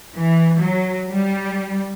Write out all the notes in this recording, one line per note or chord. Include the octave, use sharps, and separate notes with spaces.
E3
F#3
G3